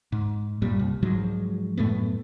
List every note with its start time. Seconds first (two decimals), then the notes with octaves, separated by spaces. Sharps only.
0.12 G#2
0.62 G2 A#2 G3
0.79 C2
1.02 G#2 F3 F#3 G#3
1.77 F#2 A2 A3 B3